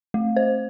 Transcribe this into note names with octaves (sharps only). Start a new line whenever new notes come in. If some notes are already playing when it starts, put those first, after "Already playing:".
A3
C5